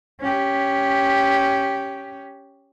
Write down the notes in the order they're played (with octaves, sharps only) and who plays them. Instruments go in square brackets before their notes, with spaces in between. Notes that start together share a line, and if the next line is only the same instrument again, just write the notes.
[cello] C#4 G4